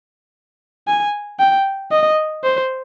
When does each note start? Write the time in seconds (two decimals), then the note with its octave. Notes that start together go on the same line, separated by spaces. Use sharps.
0.88 G#5
1.40 G5
1.92 D#5
2.44 C5